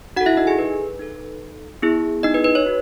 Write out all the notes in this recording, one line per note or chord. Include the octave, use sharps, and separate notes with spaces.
D#4 F#4 A4 F#5
E4 E5
D#4 D#5
G#4 G#5
B4
D#4 A4
B3 E4 G#4
D#4 D#5
B4
B4
C#5
D#4 F#4